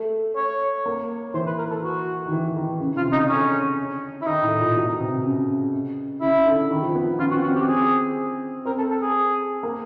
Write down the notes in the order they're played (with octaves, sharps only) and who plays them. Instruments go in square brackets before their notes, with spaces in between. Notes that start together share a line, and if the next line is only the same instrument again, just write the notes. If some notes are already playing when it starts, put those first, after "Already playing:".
Already playing: [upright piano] A3
[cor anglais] C#5
[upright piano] A#3
[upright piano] E3 [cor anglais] C5
[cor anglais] B4
A#4
A4
F#4
[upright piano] D#3
E3
D#3
C#3
[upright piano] C3 [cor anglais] F4
[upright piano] C#3 [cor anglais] D#4
[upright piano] D3 [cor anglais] C#4
[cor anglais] E4
[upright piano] D#3 [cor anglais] D#4
[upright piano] A2
A#2
B2
C3
C#3
[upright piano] C#3 [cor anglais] E4
[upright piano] D3
D#3
F3
B3
[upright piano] C#4 [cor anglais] F4
[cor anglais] F#4
[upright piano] C4
[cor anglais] F#4
[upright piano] C4 [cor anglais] G4
[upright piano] C4 [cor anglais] G#4
[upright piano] C4 [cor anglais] A#4
[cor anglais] A4
A4
G#4
[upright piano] A#3